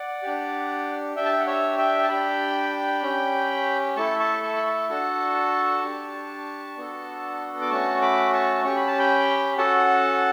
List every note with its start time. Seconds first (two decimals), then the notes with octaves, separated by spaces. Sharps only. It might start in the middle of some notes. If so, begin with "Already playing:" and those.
Already playing: D5 F#5
0.23 D4 G4
1.16 D4 G4 E5 G5
1.25 A5
1.32 G5
1.40 F#5
1.46 C#5 E5
1.78 E5 G5
2.03 A5
2.09 D4 G4 G5 B5
3.03 C#4 G4
3.96 A3 E4 A4 A5 C#6
4.20 A5 C#6
4.43 A5 C#6
4.56 B5
4.67 A5 C#6
4.90 D4 F#4 A4 A5 C#6
5.83 D4 G4
6.77 B3 D4 F#4 A4
7.61 D6
7.70 A3 C#4 F#4 A5 C#6
8.01 B5 D6
8.33 A5 C#6
8.64 C#4 G4 C#6
8.76 B5
8.87 A5
8.99 G5 B5
9.58 C#4 F#4 A4 F#5 A5